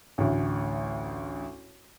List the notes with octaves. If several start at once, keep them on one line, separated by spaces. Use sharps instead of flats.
A1 D2